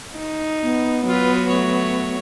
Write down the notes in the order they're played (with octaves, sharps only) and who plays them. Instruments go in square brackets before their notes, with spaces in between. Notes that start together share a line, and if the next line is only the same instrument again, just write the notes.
[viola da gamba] D#4
[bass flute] B3
[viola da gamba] F#3 F#4 [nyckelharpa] F4 B4
[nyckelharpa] A3 C#5